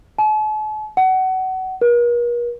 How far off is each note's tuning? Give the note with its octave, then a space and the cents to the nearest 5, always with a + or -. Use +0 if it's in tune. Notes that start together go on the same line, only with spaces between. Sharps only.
A5 -45
F#5 +25
A#4 +45